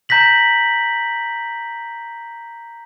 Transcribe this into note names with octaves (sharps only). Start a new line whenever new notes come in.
A#5 G6 A#6 B6 F#7